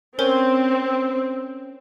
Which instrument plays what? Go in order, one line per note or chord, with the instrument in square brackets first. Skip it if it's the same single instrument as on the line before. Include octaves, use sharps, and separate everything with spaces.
[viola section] C4 [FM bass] C#4 [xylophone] A#4 C5